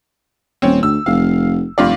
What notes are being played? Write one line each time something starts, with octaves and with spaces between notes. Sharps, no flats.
D#1 C4 C#4
D2 E6
F1 F5
F1 G2 F4 D5